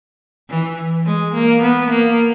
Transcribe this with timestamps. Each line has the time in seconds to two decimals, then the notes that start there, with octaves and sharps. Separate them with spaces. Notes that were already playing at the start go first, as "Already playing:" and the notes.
0.49 E3
1.06 G#3
1.34 A#3
1.62 B3
1.91 A#3